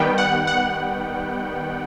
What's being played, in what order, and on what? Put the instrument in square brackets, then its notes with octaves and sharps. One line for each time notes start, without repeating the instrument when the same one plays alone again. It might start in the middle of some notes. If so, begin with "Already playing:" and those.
Already playing: [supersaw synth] D#3 G3 B3 G5
F#5
F#5